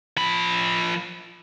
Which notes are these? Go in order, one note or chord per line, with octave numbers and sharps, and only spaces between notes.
F3 B5